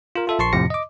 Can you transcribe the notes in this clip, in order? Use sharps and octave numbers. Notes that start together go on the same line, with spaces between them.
F4 A#4
F4 A4 E5
A#1 A5 C6 C#6 C7
F2 A2 C3 F3 A#6 C#7
D#5 D6